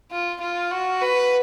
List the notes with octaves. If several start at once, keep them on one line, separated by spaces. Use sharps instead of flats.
F4
F4
F#4
B4